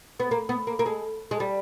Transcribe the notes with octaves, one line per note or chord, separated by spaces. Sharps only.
B3
A#3
B3
A#3
A#3
G#3
G#3
G3